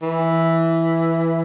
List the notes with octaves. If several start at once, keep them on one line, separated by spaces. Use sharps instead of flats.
E3